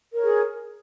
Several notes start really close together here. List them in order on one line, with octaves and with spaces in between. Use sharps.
A#4 C#5 G#4